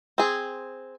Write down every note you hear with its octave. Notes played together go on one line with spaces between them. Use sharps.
C4 G#4